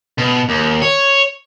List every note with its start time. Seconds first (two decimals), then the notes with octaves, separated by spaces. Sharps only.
0.18 B2
0.49 D#2
0.82 C#5